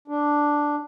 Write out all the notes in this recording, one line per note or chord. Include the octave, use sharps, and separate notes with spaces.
D4